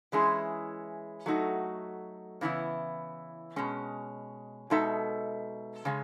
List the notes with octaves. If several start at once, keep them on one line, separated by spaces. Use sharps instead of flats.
E3 G#3 C#4 E4 G#4
F#3 A3 D#4 F#4
C#3 E3 B3 E4
B2 G#3 C#4
B2 G#3 D#4 A4 E5
C#3 G#3 C#4